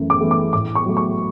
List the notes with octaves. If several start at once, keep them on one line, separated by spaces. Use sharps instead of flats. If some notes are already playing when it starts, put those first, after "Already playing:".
Already playing: F#2 E3 A3
D6
E3 A3
D6
A2 D6
C#6
F#3 A3
C#6